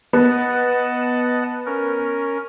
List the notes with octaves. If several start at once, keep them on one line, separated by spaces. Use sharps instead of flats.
B3 D#5 F#5 A5
C#4 A#4